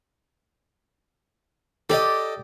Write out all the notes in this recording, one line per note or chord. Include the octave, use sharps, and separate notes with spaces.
G4 A4 D5 D#5